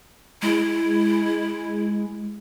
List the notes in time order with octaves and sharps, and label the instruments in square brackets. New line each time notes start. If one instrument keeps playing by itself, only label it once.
[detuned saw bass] G#3 [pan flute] E4